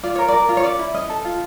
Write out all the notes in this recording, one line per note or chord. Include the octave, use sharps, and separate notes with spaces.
F4 D5
A#4 C#5
A#4 D5
F4
C#5
C#4 D5
E4
C#4 D#5
A4
F4